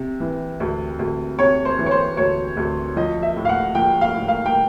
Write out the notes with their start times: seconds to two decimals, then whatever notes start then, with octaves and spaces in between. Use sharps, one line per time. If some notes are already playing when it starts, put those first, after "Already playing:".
Already playing: C3
0.20 E3
0.60 D2
0.99 D2
1.39 C3 C#5
1.65 C5
1.79 E3
1.86 C#5
1.91 C5
2.17 D2 C#5
2.57 D2
2.96 F3 D#5
3.22 E5
3.36 A2
3.45 F5
3.49 F#5
3.75 F3 G5
4.01 F5
4.15 A2
4.28 F5
4.46 G5